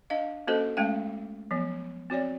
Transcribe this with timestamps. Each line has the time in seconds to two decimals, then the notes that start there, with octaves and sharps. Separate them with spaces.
0.10 D4 D#5 F5
0.47 A#3 C#4 F#4 A4 C5 D#5
0.77 G#3 A3 C#4 F5 G5
1.51 F3 F#3 B3
2.10 C4 F#4 C#5 D5